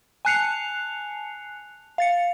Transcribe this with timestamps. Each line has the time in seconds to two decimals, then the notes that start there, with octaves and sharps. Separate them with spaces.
0.25 G#5 A5 F#6 C7 C#7 F7
1.98 F5 A6 C#7